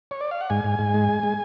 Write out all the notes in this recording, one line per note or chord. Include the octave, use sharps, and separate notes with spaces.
C#5
D5
F5
F#5
G#2 G#5
G#2
G#2
G#3
G#3
G#3